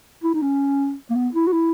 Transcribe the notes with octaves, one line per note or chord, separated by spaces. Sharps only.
E4
D#4
C#4
A#3
B3
E4
F#4
E4